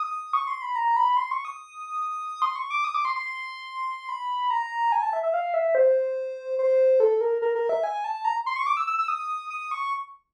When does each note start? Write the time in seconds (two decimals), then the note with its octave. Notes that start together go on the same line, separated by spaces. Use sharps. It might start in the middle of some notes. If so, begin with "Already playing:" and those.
Already playing: D#6
0.33 C#6
0.47 C6
0.62 B5
0.76 A#5
0.96 B5
1.17 C6
1.31 C#6
1.45 D#6
2.42 C6
2.56 C#6
2.71 D6
2.84 D#6
2.94 D6
3.05 C6
3.15 C6
4.09 B5
4.50 A#5
4.92 G#5
5.02 A5
5.13 E5
5.23 E5
5.34 F5
5.54 E5
5.75 C5
6.59 C5
7.00 A4
7.21 A#4
7.42 A#4
7.55 A#4
7.69 E5
7.84 G#5
8.04 A5
8.25 A#5
8.46 C6
8.56 C#6
8.66 D6
8.77 E6
8.87 E6
8.99 E6
9.08 D#6
9.50 D#6
9.71 C#6